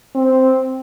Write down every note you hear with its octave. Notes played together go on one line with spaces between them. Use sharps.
C4